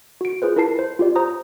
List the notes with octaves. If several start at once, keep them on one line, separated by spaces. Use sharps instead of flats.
F#4 D7
F4 G#4 B4 C5
E4 A#4 B4 A5 C7
C5
F4 G4 D5
C5 A#5 D#6